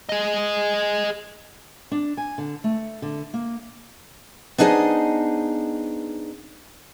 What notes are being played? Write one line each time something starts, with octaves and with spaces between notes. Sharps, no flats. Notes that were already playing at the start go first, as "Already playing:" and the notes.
G#4 D#5
D4
G#5
D3
A3
D3
A#3
B3 D4 D#4 G#4 C5 D#5